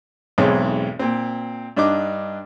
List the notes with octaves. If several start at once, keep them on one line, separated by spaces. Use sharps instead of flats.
B1 E2 G#2 C4 C#5
A#2 C4
G2 D4 D#4 D6